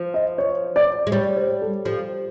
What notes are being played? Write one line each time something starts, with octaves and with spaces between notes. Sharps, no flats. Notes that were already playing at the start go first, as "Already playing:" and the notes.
Already playing: F3
D#5
C#5
D5
G#3
G3 C#5
C5
A4
F3 G4